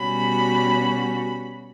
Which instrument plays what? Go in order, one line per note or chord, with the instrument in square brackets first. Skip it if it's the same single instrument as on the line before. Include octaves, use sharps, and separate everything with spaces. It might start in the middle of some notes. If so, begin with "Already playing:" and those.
Already playing: [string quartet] B2 G3 C#4 F#4 [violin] B5